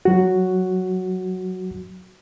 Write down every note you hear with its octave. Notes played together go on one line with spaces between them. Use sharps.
F#3 F#4